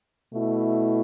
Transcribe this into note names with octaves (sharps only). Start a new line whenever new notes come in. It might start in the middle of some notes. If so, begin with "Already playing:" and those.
B2 A3 E4